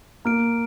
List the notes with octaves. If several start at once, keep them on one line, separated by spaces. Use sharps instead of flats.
A#3 A#5 F6 D7